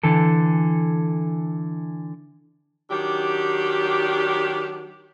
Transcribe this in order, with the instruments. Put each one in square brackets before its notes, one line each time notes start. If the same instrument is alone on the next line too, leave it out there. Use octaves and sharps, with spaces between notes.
[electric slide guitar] D3 E3 A4
[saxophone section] D#3 F#3 D4 G4